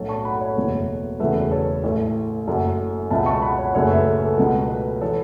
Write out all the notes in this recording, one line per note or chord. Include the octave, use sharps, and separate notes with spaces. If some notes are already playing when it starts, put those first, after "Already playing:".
Already playing: B1 A2 F#3 A3 A4 C#5
A5 C#6
F#5 B5
C#5 F#5
F#1 E2 B2 F#3 A3
E1 E2 C#3 F#3 A3 B4 E5
B4
A4 C#5
A1 A2 A3
F#1 F#2 F#3 A3
C#2 B2 F#3 E5 A5
A5 C#6
F#5 B5
C#5 F#5
F#1 F#2 C#3 A3 C#5 F#5
B4 E5
A4
B4
A4
C#2 B2 F#3 A3 B4
B4
E3 A4 C#5